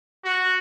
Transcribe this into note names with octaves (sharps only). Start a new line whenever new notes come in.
F#4